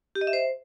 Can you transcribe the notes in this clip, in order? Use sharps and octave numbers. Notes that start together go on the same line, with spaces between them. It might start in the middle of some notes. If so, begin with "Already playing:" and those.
G4
D#5
E5
C5